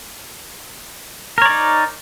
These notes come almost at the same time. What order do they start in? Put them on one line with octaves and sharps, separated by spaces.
A#4 C#5 D5 D#4